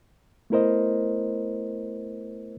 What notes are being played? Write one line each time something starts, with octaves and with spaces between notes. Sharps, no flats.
A3 B3 E4 A#4 C5 D#5